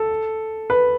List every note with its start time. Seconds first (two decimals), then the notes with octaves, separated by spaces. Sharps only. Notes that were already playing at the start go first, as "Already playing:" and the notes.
Already playing: A4
0.70 B4